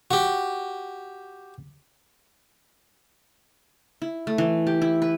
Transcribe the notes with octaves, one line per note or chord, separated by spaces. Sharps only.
F#4 G4
E4
A3
E3
G4
E4
B4